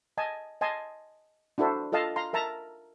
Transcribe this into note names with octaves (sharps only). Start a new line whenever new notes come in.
D#5 G#5 A5
D#5 G#5 A5 C6
D4 E4 F#4 A4 C5
F4 A4 D#5 F5 A5
F5 A#5 C6
A#4 E5 A5 A#5